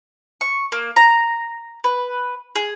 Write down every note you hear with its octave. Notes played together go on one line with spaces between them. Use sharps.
C#6
A#3
A#5
B4
G#4